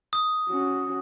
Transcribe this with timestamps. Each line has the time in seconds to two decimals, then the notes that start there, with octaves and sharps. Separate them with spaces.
0.13 D#6
0.50 C#4 F#4